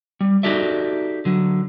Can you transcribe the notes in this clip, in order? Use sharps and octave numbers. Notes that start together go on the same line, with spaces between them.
G3
D#4 F#4 G4 A4 D5 E5
D3 F#3